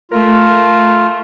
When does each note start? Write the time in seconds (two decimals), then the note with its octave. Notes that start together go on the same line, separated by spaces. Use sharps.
0.12 A3 F4 A#4